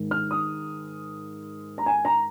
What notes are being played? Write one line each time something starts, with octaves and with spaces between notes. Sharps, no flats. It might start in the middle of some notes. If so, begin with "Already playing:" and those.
Already playing: G#2 D#3 G#3
F6
D#6
A#5
G#5
A#5